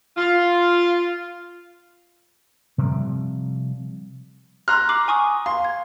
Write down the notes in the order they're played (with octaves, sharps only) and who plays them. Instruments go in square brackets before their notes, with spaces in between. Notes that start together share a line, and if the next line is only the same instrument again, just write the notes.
[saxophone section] F4
[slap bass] C3 F3 G3
[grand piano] A#5 C6 F6 [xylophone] F#6
[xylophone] D6 C7 F#7
G#5 C#6 D#6
[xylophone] F5 [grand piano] C6
[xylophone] G#6